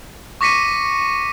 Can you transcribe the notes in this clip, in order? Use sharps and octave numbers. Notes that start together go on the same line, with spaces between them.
C#6 D6 A#6 B6 C#7 D#7